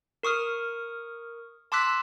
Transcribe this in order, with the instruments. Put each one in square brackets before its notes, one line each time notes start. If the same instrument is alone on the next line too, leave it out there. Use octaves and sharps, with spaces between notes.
[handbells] A#4 C#6 D#6 F6
A5 C6 D6 E6 F#6 B6